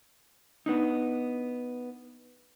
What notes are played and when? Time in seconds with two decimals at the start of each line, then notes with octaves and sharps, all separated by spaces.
0.66 B3 D4 D#4